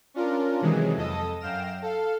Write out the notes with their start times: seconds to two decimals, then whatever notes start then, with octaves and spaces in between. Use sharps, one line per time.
0.14 C#4 D4 F4 A#4
0.61 C3 D#3 E3 F#3 G#3 G#4
0.97 F2 A4 D#5 D#6
1.40 F#2 F5 G5 F6 A#6 E7
1.82 A4 F5